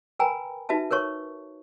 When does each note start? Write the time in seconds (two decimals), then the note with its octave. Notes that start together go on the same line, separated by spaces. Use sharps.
0.19 A#4 B4 G5 G#5 A#5 B5
0.69 D#4 F#4 B4 E5 A5
0.91 A#4 B4 C#5 C#6